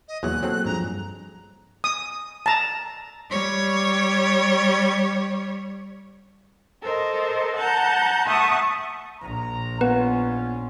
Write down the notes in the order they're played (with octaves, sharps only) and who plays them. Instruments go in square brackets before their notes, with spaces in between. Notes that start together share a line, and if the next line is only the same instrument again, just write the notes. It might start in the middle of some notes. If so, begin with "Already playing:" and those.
[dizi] D#5
[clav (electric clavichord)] E2 B2 F#3 [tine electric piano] A#3 G#4 [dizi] F#6
[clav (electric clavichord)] F#3 C4 A4
[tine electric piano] G2 F3 G#4 [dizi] A#5
[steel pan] D#6
A5 A#5
[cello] G3 C#5
[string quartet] A4 A#4 C5 D#5
F#5 A5 A#5 G6
E5 F#5 A5 C#6 D#6
[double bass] A#1 [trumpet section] A#5
[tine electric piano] B3 F#5 [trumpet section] C#4 F4 [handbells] B4